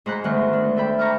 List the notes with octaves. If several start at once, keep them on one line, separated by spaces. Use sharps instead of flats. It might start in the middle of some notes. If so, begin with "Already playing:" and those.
G#2 C5 F#5 A#5 B5 F#6
D2 D#3 G#3 B3 D#4 F#6
D4
D4 A4 E5 G5 B5
A5 A#5 C#6 D6 F6